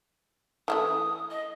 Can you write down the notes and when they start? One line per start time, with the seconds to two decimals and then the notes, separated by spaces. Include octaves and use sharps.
0.68 E3 F#3 A3 D#6
1.31 D#5